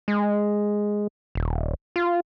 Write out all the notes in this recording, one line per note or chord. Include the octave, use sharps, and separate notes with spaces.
G#3
D#1
F4